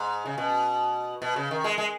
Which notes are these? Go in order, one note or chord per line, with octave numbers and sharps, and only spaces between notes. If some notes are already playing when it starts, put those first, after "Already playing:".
Already playing: G#2
C#3
B2
B2
C#3
D#3
G#3
G#3